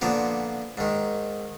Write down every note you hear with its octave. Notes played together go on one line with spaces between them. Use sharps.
A#2 D3 F3 A#3 B3
G#2 D#3